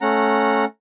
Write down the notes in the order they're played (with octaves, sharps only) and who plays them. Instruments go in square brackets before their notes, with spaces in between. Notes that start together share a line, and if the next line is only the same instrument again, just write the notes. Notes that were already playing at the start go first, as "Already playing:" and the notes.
[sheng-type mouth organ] A3 C#4 F#5 A#5